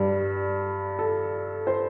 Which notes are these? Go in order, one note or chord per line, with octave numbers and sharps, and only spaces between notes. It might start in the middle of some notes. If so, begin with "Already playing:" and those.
Already playing: G2 G3
A4
C5